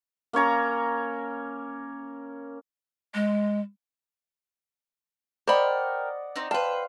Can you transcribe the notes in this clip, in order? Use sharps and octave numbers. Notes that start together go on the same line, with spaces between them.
A#3 C#4 C#5 A#5
G#3
A#4 C5 D5 D#5 F#5 G5 B5
C4 D#4
B4 C5 F5 G5 A5